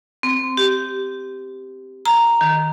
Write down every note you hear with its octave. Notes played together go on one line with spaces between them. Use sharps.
C4
G4
A#5
D#3